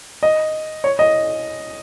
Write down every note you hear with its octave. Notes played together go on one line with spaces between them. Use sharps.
D#5
C#5
D#5